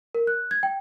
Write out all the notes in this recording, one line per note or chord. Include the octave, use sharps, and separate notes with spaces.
A#4
F#6
G#6
G5